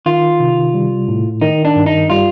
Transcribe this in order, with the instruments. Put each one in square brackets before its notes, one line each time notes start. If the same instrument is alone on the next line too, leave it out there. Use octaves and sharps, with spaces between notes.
[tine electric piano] D#3 [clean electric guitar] F4
[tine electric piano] C3
G3
A2
[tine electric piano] D#3 [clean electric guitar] D#4
[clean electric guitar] D4
[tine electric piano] G2
[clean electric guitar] D#4
[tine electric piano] G3 [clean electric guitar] F4